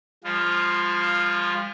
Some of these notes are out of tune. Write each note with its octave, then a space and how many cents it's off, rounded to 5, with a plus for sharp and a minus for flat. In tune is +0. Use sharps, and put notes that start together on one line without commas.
F3 +0 G#3 -45 F4 +0